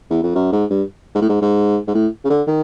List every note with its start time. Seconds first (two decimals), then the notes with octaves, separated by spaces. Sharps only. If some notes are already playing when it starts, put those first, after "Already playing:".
0.10 E2
0.23 F2
0.35 F#2
0.53 G#2
0.70 G2
1.15 G#2
1.22 A2
1.29 G#2
1.41 G#2
1.88 G#2
1.95 A2
2.24 C#3
2.30 D3
2.47 D#3